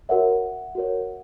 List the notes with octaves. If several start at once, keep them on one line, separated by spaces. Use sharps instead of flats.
F#4 A#4 C#5 E5 F#5
F#4 A#4 C#5